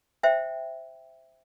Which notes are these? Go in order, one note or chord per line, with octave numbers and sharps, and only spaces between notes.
C5 E5 G5